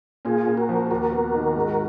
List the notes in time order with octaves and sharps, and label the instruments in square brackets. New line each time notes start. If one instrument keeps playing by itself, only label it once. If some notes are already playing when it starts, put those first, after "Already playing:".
[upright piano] A#2 [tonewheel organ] F4 G#4
[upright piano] A#2
[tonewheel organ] F#4 A#4
[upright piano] F3
[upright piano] D#2 [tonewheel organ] F#4 A#4
[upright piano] B3
D#3
G#2